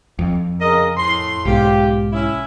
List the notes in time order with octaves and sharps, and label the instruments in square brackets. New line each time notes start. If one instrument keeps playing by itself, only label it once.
[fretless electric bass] F2
[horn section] C#3 A#4 D#5
A2 C6
[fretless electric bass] B1 G#2 [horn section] F4 G4
[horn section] C#4 E4